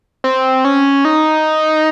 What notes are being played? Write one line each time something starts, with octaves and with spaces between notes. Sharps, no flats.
C4
C#4
D#4